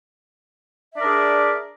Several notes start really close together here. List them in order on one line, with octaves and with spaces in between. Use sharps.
E5 D5 A#4 D4 G#4